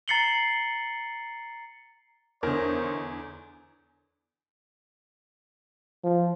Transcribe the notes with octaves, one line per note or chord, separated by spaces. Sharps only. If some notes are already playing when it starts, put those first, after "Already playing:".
A#5 A6 C7 C#7 F#7 G7
E2 D3 D#4 A#4 C5 C#5
F3